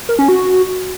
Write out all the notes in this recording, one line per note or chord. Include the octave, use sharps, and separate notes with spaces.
A#4
C#4
F#4